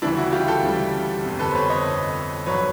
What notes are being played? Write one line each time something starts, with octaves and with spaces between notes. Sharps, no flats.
D2 C#3 E3 G3 D4 E4
E4 F#4
F4 G4
G4 A4
D2 C#3 E3 G3
G1 F2 C3
A4 B4
C5
B4 C#5
C#5 D#5
G1 F2 C3
G#1 G2 D3 F#3 B4 C#5